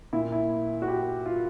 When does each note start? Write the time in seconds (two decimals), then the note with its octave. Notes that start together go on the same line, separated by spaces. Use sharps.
0.13 A#2 E4
0.32 E4
0.82 F#4
0.88 G4
1.26 F4